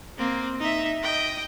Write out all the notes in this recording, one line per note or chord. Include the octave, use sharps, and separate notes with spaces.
A#3 C4
D#4 E5
D#5 G5